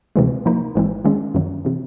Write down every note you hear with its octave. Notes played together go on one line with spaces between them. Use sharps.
D2 C3 E3 G#3
G#2 F3 A#3 D#4
G#1 G#2 E3 G#3 C4
D#3 G#3 C#4
F#2 D#3 F#3
C3 E3